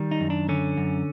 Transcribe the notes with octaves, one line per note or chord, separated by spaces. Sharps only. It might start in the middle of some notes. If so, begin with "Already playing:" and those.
Already playing: D#3 G3
D#4
F#2
D4
D3 C#4
F#2